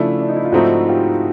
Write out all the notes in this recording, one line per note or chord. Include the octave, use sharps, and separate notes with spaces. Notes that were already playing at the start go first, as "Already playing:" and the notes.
Already playing: C#3 F3 A3 D4 E4
D4
D#4
E4
F4
G#2 F3 A3 C4 D#4 E4 F#4
F4 G4